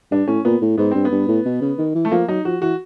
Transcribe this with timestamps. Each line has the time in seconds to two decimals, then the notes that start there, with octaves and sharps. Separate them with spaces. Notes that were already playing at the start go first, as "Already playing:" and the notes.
0.11 G2 D4
0.28 A2 C#4
0.45 A#2 B3
0.62 A2
0.78 G#2 B3
0.91 G2 C4
1.05 B3
1.12 G2
1.28 A2
1.45 B2
1.61 C#3
1.78 D#3
1.95 E3
2.05 A3
2.12 F3 A#3
2.28 F#3 D#4
2.45 F3 F#4
2.62 E3 F#4